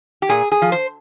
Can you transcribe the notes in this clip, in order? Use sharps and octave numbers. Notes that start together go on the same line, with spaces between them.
G4
A#2 G#4
G#4
F3
C5